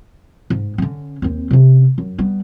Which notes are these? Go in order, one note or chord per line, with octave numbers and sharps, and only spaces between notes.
G#2
D3 C#4
D#2 C4
C3 C#4
F#2
G3 B3